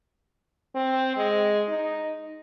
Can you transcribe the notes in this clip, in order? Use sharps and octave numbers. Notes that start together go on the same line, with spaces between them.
C4
G#3
D#4